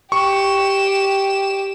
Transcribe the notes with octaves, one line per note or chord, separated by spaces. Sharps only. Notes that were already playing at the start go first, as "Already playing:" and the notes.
G4 C#6 E7